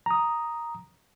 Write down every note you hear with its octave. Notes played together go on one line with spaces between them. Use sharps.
A#5 D#6